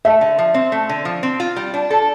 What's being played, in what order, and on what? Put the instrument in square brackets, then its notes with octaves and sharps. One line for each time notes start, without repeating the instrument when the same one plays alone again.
[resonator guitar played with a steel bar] A3 [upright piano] E5
[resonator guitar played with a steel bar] D3
F3
C4
A3
D3
F3
C4
F4
G3
D4
A4